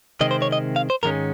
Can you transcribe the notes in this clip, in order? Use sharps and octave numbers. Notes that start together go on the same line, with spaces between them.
C3 D#3 G#3 C4 D#5
C5
C#5
D#5
F5
C5
G#2 D#3 G#3 C#4 A#4